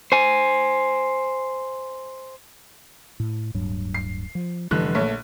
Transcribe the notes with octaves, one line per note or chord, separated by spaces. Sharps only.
C5 G#5
A2
D1 G2 F#3
C7
F3
F1 D3 E3 F3 G3 F#6
A#1 A3 C#5